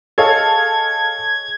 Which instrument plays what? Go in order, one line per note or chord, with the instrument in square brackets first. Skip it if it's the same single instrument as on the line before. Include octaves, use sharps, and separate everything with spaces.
[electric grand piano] G#4 C#5 D#5 [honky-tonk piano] A4 F5 [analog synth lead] G#6